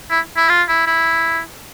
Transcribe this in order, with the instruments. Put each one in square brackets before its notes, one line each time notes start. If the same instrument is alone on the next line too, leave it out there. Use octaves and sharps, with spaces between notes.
[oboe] E4
E4
F4
E4
E4